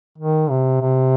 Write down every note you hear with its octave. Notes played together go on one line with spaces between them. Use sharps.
D#3
C3
C3